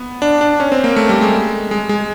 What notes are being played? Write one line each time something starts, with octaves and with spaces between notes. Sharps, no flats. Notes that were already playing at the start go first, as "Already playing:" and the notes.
Already playing: B3
D4
D4
C#4
C4
A#3
A3
G3
G#3
G#3
G#3